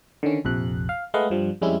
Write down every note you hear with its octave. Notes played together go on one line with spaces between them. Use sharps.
D3 D#3 C#4
A#1 F2 C3 F#6
F5
G#3 A3 B4 D#5 F5 F#5
G2 F3 G3
F2 G3 G#3 C#4 E4